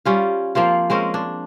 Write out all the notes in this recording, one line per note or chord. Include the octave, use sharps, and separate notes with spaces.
G3 C#4 F4
F3 A#3 C4 F4
G#3 C4 C#4 A#4
D4